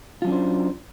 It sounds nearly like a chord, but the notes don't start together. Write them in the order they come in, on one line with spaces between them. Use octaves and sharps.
F4 F#3 C#4 D4 C5